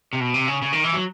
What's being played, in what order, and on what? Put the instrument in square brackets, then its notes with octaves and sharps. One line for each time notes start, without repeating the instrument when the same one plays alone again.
[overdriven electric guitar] C3
B2
C3
C#3
C#3
D#3
E3
F#3